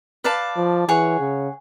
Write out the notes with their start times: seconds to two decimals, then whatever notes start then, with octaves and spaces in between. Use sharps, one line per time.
0.24 B4 D5 F5 A5
0.57 F3
0.88 E3 G#4 C#5 F#5
1.20 C#3